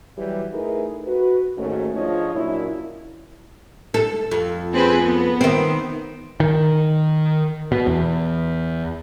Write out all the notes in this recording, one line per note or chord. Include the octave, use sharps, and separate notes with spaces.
E3 F#3 G3 G4
A3 D#4 E4 G#4 A#4 B4
F#4 B4
D#2 G#2 D#3 A3 C#4 F#4
G#2 F3 D4 F4 C#5 D#5
F#2 A#2 D4 E4
A4
F2
C4 G#4 B4
B3
D#3 C4
D#3
B2
E2